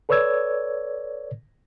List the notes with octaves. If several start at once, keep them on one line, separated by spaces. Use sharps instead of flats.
A4 B4 C#5 D5 E6 G#6